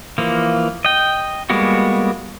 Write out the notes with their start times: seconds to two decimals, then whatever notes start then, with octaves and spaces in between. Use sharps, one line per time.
0.18 E3 F3 A#3
0.85 D#5 G5
1.50 G3 G#3 A#3 B3 F#4